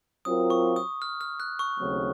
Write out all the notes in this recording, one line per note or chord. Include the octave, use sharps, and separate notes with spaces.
F#3 C4 F4 A#4 D#6
C#6
D#6
F6
F6
F#6
C#6
D#2 C#3 F#3 A3 C4